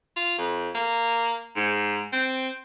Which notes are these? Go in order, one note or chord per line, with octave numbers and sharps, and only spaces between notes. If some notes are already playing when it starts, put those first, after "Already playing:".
F4
F2
A#3
G#2
C4